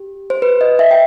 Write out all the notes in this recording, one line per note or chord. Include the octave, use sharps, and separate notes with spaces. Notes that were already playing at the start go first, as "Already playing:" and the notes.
Already playing: G4
C5
B4
D#5
E5
G5